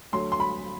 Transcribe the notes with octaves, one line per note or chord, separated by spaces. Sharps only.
D2 D3 F#3 C6
C6
B5